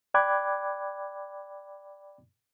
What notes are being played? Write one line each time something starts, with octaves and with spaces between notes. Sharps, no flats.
D5 G5 B5 D6 F#6 G#6